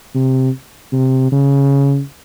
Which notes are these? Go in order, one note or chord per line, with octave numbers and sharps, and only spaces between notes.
C3
C3
C#3